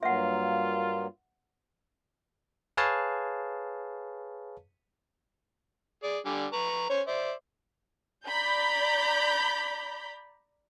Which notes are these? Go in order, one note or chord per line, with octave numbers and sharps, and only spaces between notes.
G2 F#3 A#3 F4 E5 F#5
G#4 B4 C#5 F5 A5
G#4 D5
D3 G3 G#5
B4 A#5 C#6
C#4 C5 C#5
C5 D5 E5
D5 A#5 B5 G6